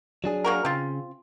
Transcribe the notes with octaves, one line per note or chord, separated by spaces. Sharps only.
F#3 D4 G#4
A#3 F#4 A#4
C#3 C4 F4